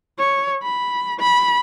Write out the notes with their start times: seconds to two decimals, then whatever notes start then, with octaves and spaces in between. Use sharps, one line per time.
0.19 C#5
0.63 B5
1.20 B5